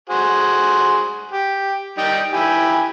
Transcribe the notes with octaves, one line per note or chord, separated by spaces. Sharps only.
F#4 G#4 C5
G4
G3 D#4 G5
E4 G4 G#5